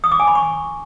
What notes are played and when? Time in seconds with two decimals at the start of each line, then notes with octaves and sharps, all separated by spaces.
0.04 D#6
0.12 D6
0.20 G#5
0.27 B5
0.35 C#6